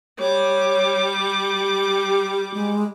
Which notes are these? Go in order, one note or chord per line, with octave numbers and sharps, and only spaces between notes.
G3 C#5 D6
G4
G#3